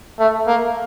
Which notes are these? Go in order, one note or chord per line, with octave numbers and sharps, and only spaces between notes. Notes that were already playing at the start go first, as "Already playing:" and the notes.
A3
A#3